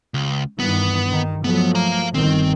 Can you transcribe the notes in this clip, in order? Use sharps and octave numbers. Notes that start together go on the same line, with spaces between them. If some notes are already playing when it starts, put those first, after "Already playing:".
C#2
G2 D#3 E3 B3
D#3
F3 F#3 A3 B3
F5 A#5
G1 D#3 C4